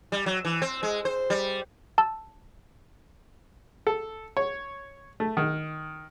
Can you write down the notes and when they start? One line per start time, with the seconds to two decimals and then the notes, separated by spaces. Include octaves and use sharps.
0.12 G3
0.26 F#3
0.45 E3
0.62 C4
0.83 G#3
1.05 C5
1.30 G3
1.98 A5 E6
3.87 A4
4.37 C#5
5.20 A3
5.37 D#3